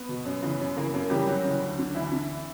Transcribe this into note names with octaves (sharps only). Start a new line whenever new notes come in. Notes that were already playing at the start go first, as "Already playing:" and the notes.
Already playing: B3
B2
F#2
C#3 E3
F#2
C#3 E3 A#3 A#4
F#2 A#3 A#4
C#3 E3 G3 G4
F#2 F#3 F#4
C#3 E3
D2
D3
D2 E3 E4
D3